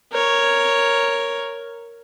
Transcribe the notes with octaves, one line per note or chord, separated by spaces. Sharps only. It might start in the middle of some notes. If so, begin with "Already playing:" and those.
A#4 C#5